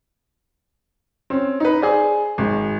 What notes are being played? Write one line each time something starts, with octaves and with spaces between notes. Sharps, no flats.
C4 C#4
D#4 B4
G#4 C5 D5
G#1 G#3